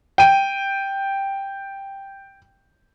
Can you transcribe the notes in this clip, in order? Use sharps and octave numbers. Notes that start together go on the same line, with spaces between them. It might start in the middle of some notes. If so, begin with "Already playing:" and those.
G5 D#7